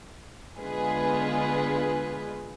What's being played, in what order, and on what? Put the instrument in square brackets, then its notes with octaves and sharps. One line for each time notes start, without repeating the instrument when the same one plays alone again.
[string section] D3 G#3 B3 F4 G#4 B4